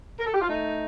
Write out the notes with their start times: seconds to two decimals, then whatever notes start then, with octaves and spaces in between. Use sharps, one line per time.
0.20 A#4
0.27 A4
0.34 G4
0.41 F4
0.49 A3 D#4